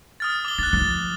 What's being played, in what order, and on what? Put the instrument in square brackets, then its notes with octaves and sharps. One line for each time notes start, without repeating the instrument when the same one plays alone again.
[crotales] D#6 F6 A6
D6 G7
[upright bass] D#4 [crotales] F#6 A6
[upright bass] F3 [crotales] A6